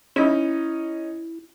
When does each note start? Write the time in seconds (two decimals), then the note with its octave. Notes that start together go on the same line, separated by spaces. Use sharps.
0.16 C#4 D#4 E4